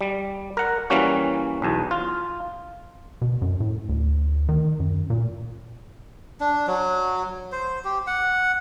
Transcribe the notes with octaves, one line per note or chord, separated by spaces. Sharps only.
G3
A#4 F#5
E3 G3 A#3 C#4 F#4
B1 E2
F4
B2
F#2
A2
D2
D#3
F#2
A#2
D4
F#3
C5
G4
F#5